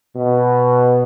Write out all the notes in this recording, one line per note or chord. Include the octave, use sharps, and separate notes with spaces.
B2